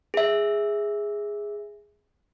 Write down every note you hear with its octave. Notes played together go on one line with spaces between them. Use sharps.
G#4 E5